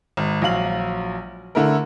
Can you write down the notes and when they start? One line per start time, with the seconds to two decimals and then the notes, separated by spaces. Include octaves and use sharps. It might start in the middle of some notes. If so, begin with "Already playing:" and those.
0.17 G#1
0.42 A#1 F#3 F5 F#7
1.55 D3 A3 E4 A#4